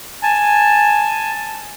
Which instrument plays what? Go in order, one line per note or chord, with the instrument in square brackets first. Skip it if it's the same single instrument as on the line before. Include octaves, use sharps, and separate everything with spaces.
[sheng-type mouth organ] G#5 A5